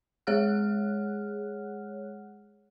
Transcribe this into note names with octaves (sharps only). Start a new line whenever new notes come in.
G#3 G#4 C#5 F#5 F6 F#6